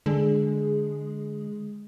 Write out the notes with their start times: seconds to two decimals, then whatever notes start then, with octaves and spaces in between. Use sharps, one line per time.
0.06 D3 G#3 G#4